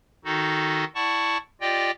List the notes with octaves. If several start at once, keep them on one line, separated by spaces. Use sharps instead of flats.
D#3 D#4 F#4 A4
E4 D5 F#5 A5 C#6
F4 G4 D5 D#5 G5